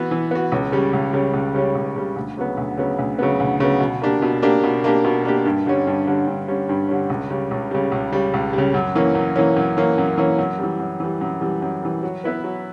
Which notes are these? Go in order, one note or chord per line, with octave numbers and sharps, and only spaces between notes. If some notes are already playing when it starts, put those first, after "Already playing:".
Already playing: E3 B3 F#4
E3
B3 F#4
C#2
C#3 G3 C#4
C#2
C#3 G3 C#4
C#2
C#3 G3 C#4
C#2
C#3 G3 C#4
D2
C#3 F#3 B3
D2
C#3 F#3 B3
D2
C#3 F#3 B3
D2
C#3 F#3 B3
B2
A#3 D4 G4
B2
A#3 D4 G4
B2
A#3 D4 G4
B2
A#3 D4 G4
G2
D3 G3 C#4
G2
D3 G3 C#4
G2
D3 G3 C#4
G2
D3 G3 C#4
C#2
C#3 G3
C#2
C#3 G3
C#2
C#3 G3
C#2
G3
C#3
F#2
E3 A#3 C#4
F#2
E3 A#3 C#4
F#2
E3 A#3 C#4
F#2
E3 A#3 C#4
F#2
E3 G3
F#2
E3 G3
F#2
E3 G3
F#2
E3 G3
F#3
B3 E4 B4
F#3